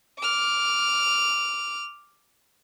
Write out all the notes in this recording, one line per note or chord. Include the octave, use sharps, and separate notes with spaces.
D6 F6